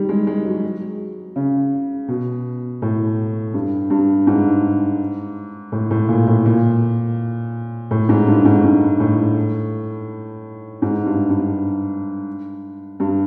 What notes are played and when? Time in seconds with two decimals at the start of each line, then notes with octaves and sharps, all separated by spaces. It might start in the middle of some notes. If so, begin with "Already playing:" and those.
Already playing: D#3 G3
0.09 G#3
0.27 G#3
0.45 F#3
1.36 C#3
2.08 B2
2.82 A2
3.54 G2
3.90 G2
4.27 G#2
5.72 A2
5.91 A2
6.09 A#2
6.27 A2
6.46 A#2
7.91 A2
8.09 G#2
8.27 G2
8.45 G#2
8.64 G#2
9.00 A2
10.82 G#2
11.06 G2
11.30 G2
13.00 G2